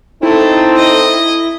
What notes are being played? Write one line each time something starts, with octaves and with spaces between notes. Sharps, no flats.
A3 C4 D#4 E4 A4
D#5